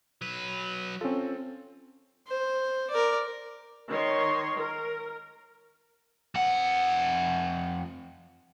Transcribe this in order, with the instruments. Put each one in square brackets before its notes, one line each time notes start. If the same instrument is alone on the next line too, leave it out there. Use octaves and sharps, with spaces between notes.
[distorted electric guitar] F#3 B4
[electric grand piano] C4 A4 [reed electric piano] C#4 F4
[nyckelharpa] C5
A#4 D5
[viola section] D#3 C#5 C6
A#4
[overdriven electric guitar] F2 F#5